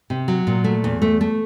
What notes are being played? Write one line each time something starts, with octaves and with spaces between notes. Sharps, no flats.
C3
F#3
A#2
A3
E2
A3
A3